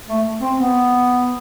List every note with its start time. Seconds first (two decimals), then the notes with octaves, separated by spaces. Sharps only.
0.08 A3
0.41 C4
0.58 B3